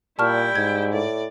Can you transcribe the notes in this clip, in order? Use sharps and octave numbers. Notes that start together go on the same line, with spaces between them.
A#2 G3 E4 G5 A5 C#6 F6
G#2 G#6
A2 D5